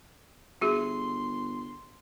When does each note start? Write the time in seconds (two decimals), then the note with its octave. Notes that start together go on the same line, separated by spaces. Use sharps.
0.61 G1 F#4 G#4 E5 C6